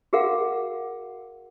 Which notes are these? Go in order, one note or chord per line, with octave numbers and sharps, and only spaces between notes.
F#4 G#4 A#4 F5 F#5